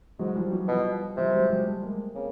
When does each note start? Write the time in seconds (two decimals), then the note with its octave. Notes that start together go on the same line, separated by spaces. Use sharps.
0.19 G#2 F#3 G#3
0.36 F3 G3
0.52 E3 F#3
0.68 B2 F3 G3
1.17 C3 F3 G3
1.34 F#3 G#3
1.50 F#3 G#3
1.66 G3 A3
1.83 G#3 A#3
2.15 C#3 A#3 C4